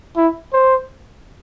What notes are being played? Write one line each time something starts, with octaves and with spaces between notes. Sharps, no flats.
E4
C5